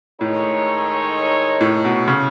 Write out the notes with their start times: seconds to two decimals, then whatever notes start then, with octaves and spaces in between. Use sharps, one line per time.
0.21 A2 D#3 G#3 D#4 A4 C#5
1.61 A2
1.85 B2
2.08 C#3